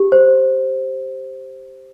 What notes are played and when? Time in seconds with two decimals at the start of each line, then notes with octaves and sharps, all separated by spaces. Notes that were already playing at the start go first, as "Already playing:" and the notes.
Already playing: G4
0.12 C5